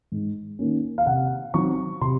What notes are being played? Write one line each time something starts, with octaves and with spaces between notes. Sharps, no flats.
G#2
D#3 A#3 C#4
F5
C3 F#5
F#3 C4 D#4 C#6
C3 C6